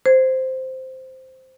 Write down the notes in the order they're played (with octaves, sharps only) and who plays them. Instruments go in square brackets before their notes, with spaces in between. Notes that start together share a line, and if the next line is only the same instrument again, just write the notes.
[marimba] C5 G#6